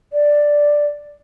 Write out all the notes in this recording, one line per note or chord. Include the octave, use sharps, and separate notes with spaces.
D5